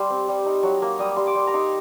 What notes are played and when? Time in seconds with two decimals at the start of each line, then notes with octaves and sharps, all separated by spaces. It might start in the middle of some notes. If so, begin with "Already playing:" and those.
Already playing: G3 C6
0.10 C4
0.28 G3
0.46 D#4
0.63 F#3
0.82 A#3
0.99 G3 D#6
1.16 G3 C6
1.27 D6
1.35 G3
1.47 A#5
1.53 D#4 C6